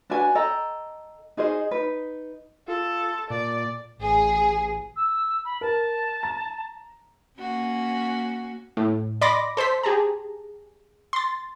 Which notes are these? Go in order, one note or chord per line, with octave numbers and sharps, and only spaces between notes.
D4 F#4 B4 G#5
A4 D#5 G5 A#5
D#4 G#4 C5 D#5
D#4 B4
F4 A4
A#2 D5
A1 G#4
E6
B5
A#4 A5
A#5
A#3 C#4 F#4
A2
D5 D#5 B5 C6 D6 A#6
A4 C5 C6 B6
G4 G#4 A5 A#5
C6 A6